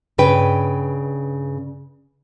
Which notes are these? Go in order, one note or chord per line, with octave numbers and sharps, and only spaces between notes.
G2 C#3 B4 G5